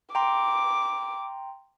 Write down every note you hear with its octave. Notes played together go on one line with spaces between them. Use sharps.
G5 A#5 C6 D6